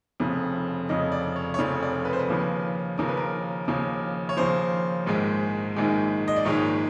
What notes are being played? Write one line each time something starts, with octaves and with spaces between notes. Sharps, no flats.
F1 F2 C#3
F1 F2 C#3 D#5
D5
C#5
C#5
F1 F2 C#3 D5
D5
B4
C5
B4
D#2 C#3 F3
D#2 C#3 F3 A#4
B4
A#4
D#2 C#3 F3
C#5
D#2 C#3 F3 C5
A#1 G#2 D#3 G#3
A#1 G#2 D#3 G#3
D#5
D5
A#1 G#2 D#3 G#3 C#5